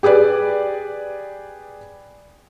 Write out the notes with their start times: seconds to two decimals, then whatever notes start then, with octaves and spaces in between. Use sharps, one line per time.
0.03 G4 G#4 B4 D5